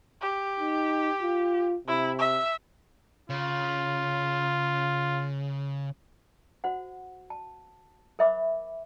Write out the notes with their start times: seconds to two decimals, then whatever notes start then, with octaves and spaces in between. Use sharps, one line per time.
0.22 G4
0.60 D#4
1.22 F4
1.88 C3 E4
2.19 E5
3.30 C#3 F4
6.64 F#4 C5 F#5
7.30 A5
8.19 A#4 C5 E5 B5 D6